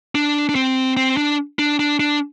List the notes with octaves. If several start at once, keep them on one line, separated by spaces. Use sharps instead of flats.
D4
D4
C4
C4
D4
D4
D4
D4